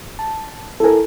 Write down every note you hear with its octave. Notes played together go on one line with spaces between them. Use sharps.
A5
E4 A4 A#4 G#5